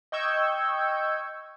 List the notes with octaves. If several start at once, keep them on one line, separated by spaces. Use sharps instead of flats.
D#5 G5 C#6 E6 G6 G#6